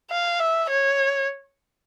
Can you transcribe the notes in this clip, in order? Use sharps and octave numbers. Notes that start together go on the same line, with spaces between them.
F5
E5
C#5